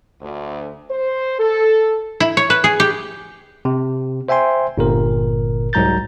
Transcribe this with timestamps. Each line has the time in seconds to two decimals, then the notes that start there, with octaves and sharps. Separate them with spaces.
0.21 D2
0.90 C5
1.39 A4
2.20 E4
2.37 C#5
2.50 B4
2.64 G#4
2.80 G4
3.65 C3
4.29 C5 E5 G5 G#5 C6
4.77 G1 A#2 A#4
5.73 C2 G#2 F#3 A#5 G6 A6